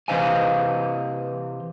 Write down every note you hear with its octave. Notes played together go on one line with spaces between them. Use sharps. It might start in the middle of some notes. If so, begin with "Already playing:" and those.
C3 E3 C5 D#5 F5 G#5